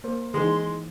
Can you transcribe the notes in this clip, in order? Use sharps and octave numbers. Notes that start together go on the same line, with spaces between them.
A#3 A#4 C5
D#3 E3 G#3 D#4 C6